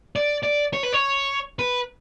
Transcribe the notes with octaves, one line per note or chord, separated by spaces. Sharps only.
D5
D5
C#5
B4
C#5
B4